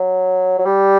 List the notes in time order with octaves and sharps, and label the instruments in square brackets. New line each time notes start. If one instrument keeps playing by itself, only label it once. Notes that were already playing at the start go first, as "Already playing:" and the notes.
Already playing: [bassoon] F#3
F#3
G3